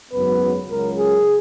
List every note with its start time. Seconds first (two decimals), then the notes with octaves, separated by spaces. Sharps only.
0.12 G#1 F#2 C#3 F#3 B3 B4
0.69 C#2 C#3 F#3 A#4
0.98 G#4